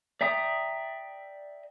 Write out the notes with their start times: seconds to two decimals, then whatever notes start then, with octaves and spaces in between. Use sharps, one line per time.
0.21 D5 E5 G5 A#5 D#6